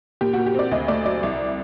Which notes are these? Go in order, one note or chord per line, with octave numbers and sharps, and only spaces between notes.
A#2 G4
A#2 F#4
G4
C4 D5
D2 D#5
A3 D5
F#3 D5
C2